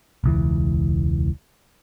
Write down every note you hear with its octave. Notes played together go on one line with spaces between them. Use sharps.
E1 C#2 E3